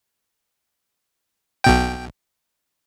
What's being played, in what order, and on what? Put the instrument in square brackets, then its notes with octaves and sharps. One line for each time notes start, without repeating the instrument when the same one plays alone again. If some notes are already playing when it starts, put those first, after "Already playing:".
[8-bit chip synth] B1 B2 G5